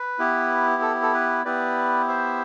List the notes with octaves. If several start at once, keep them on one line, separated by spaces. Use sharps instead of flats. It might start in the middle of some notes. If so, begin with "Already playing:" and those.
Already playing: B4
B3 E4 G4
A4
A4
B4
B3 E4 G4 B4 D5
C5 E5